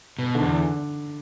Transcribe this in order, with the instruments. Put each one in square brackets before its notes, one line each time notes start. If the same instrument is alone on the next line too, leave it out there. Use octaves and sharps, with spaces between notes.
[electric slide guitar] B2
[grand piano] D3
[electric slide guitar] E2